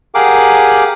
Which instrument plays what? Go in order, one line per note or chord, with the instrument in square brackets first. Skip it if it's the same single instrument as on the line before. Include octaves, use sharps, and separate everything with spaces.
[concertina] G4 G#4 A#4 F5 F#5 D6